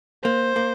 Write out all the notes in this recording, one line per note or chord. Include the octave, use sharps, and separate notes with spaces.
A#3 C5
A#3